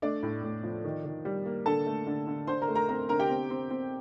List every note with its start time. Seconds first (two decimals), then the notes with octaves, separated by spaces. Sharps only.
0.02 A3 D4 D5
0.23 A2
0.43 A2
0.63 F3
0.85 D#3
1.05 D#3
1.25 G3
1.46 A#3
1.66 D3 A4 A5
1.87 A3
2.07 D3
2.27 D3
2.47 D3 C5 C6
2.62 A#4 A#5
2.68 A3
2.75 A#4 A#5
2.89 C4 A#4 A#5
3.09 D3 A#4 A#5
3.19 G4 G5
3.29 C4
3.50 C4
3.71 C4